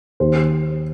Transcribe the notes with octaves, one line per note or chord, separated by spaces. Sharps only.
D#2 C5